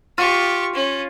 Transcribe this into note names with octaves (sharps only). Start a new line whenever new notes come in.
F4 G4 C#6
C#4